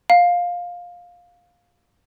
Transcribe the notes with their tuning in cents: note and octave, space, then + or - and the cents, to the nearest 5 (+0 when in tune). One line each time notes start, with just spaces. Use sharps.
F5 +15